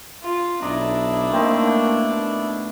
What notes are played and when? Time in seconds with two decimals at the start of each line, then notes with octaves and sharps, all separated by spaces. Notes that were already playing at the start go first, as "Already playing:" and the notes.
0.22 F4
0.62 B1 D4 E4 D5 D#5 A#5
1.31 A3 A#3 C4 D#4
1.65 B2